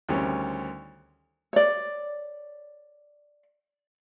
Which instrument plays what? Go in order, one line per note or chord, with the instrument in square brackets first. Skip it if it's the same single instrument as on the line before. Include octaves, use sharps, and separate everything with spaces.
[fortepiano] D2 D#3 G3 C4 C#4
[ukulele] C#5 D5